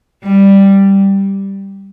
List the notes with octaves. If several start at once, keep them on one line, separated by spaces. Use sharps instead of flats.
G3